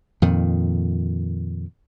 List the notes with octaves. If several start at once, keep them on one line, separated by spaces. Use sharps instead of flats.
F2 A#2 D#3